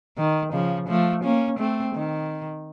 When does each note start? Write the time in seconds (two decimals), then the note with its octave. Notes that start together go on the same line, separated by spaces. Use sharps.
0.18 D#3
0.53 C#3 F3
0.88 F3 A3
1.24 A#3 C#4
1.59 A3 C4
1.95 D#3